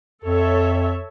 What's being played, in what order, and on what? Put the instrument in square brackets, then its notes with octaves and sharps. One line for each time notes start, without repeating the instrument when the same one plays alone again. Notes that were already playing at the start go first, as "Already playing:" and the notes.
[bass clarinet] F2 [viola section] A4 C#5 E5